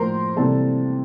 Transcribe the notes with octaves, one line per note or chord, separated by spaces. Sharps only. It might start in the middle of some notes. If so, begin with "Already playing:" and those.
Already playing: A2 F3 A#3 A#4 C5 A#5 C6
C3 E3 G3 A#3 A4 A5